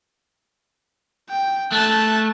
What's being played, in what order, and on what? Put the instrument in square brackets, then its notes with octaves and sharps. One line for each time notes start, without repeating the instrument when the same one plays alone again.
[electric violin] G5
[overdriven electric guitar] A3 [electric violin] A5 F#6